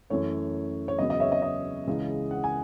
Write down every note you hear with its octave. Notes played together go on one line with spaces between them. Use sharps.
F#2 E3 A3 C#5
C#5
E2 C#3 F#3 B3 D#5
D#5
C#5 E5
D#5
D#5
C#2 C#3 E3 G#3
F#5
G#5